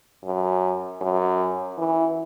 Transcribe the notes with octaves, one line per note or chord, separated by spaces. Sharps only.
F#2
F#2
E3